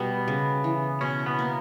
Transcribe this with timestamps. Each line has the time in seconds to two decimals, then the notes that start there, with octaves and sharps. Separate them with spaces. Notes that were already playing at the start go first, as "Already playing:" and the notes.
Already playing: B2 G3 B3
0.28 C#3
0.64 E3
1.01 B2 C#4
1.26 B3
1.39 A#3